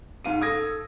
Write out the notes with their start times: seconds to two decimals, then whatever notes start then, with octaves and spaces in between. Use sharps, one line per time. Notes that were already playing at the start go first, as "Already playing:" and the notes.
0.24 G#2 F5 D#7
0.42 A4 D#6 G#6 A#6